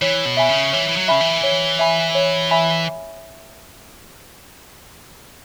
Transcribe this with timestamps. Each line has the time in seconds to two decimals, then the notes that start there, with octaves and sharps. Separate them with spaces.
0.02 E3 C#5
0.26 B2
0.37 E5 G#5 B5
0.49 C#3
0.72 E3 C#5
0.88 E3
0.97 F#3
1.08 C#3 E5 G#5 B5
1.21 E3
1.43 C#5
1.79 E5 G#5 B5
2.15 C#5
2.51 E5 G#5 B5